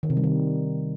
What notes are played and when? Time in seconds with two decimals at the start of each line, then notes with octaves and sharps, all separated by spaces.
0.03 D#3
0.10 C3
0.17 G3
0.24 D#3